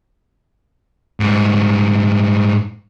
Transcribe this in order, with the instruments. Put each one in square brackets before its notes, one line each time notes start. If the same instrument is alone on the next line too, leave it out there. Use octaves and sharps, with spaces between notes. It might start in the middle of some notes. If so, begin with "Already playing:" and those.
[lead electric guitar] G#2 G3